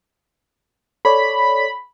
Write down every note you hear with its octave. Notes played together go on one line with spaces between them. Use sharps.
A4 C#5 D5 B5